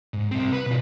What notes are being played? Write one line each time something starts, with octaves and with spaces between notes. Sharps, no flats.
G#2
C2 C4
B4
B2 F4